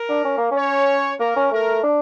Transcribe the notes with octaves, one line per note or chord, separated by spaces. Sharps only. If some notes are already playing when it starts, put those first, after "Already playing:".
Already playing: A#4
D4
C#4
A#3
C#4 C#5
A#3 A#4
C#4
A3 A#4
D4